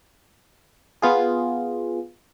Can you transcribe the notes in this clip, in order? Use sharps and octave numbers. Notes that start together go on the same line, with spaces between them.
B3 F4 G#4